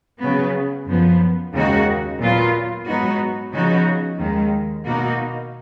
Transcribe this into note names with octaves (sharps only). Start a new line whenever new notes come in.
C#3 F#3 B3
F#2 F3 B3
D#2 C#3 G#3 D#4 F#4
A#2 F#3 B3 F4
G#2 F#3 B3 D#4 F#4
C#3 F3 B3 D#4 F#4
D#2 D#3 G#3
B2 A#3 D#4 F#4